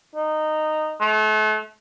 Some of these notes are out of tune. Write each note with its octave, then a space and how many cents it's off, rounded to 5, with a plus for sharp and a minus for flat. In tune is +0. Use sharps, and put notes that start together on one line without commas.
D#4 -15
A3 -35